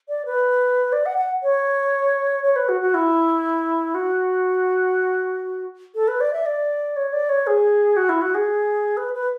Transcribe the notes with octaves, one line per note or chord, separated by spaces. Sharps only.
D5
B4
D5
F#5
F#5
C#5
C#5
B4
F#4
F#4
E4
F#4
A4
B4
D5
E5
D5
C#5
D5
C#5
G#4
F#4
E4
F#4
G#4
B4
B4